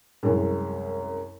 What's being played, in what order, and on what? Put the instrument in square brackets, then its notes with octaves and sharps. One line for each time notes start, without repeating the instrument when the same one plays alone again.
[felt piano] C2 F#2 G#3